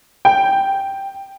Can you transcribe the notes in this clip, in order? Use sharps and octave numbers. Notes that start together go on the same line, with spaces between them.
G5